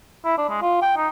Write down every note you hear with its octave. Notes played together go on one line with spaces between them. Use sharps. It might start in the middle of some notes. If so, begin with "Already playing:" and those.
E4
D4
G#3
F4
G5
D#4